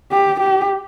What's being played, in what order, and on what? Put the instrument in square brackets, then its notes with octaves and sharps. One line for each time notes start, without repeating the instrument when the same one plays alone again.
[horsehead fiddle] G4
G4